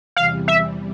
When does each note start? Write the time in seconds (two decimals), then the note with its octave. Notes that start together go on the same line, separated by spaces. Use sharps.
0.16 E2 C3 E3 G3 F5
0.48 E5